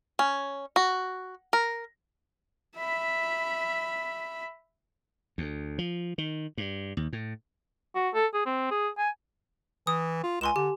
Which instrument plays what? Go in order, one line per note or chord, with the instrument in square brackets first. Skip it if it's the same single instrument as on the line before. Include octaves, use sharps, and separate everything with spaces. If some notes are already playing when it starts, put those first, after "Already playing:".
[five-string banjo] C#4
F#4
A#4
[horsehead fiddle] E5 B5
[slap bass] D2
F3
D#3
G2
D#2
A2
[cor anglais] F#4
A4
G#4
C4
G#4
G#5
[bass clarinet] E3 [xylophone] D#6
[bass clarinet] F4
[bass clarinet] C#2 [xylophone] G#5 C6 E7
[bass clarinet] D3 [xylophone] G4